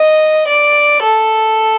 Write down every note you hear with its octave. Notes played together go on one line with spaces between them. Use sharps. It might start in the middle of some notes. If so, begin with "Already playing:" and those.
Already playing: D#5
D5
A4